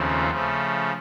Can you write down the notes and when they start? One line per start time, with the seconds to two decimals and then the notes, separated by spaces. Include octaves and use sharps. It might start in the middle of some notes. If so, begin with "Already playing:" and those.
Already playing: D#2 C#3 F3 A3 C4
0.30 C#3 F3 A3